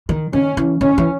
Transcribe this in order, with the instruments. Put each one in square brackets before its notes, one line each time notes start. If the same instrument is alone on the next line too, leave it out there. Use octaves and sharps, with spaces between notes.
[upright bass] D#3
[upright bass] D#3 [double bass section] C#4
[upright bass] E3
[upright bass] D#3 [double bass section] C#4
[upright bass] E3